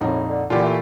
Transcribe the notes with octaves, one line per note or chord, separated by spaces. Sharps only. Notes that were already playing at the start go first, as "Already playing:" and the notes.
A#1 F2 A2 D#4
D3
A#2 D3 E3 F4 G4
A3